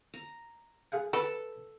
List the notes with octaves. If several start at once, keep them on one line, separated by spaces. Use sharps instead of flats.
A#5
G#4 F5 F#5
A4 B4